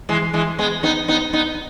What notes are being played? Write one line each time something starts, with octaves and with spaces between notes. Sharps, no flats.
E3 G#3
E3 G#3
G#3 B3
B3 D#4
B3 D#4
B3 D#4